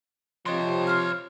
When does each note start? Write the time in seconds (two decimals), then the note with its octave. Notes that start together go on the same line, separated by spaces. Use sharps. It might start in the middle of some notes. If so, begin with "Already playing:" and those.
0.46 C3 F3 D4 G4 C#5 D#5 C6
0.87 C5 F6